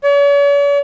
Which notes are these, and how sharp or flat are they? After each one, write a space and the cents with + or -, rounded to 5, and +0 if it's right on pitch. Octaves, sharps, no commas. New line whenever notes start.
C#5 +45